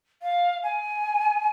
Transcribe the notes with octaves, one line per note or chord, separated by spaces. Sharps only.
F5
G#5